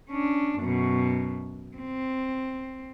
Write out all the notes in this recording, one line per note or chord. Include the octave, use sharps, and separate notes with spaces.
C#4 D4
F#2 B2
C4